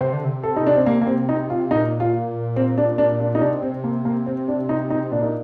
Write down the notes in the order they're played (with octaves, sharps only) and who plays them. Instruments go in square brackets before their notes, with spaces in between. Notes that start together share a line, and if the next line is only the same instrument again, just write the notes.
[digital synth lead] C3 [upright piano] C5
[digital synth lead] D3
C3
[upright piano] A4
D#4
D4
C4
A#3
A#3
C4
D#4
F4
[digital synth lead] A#2 [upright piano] D#4
[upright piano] F4
C4
D4
D4
D4
D#4
[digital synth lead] C3 [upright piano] D4
[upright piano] C4
A#3
A#3
C4
D4
D#4
D#4
[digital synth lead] A#2 [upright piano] D4
[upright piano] D#4